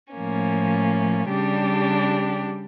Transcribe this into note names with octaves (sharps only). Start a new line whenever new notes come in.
A2 F3 A#3 C#4
C#3 G3 D4 G4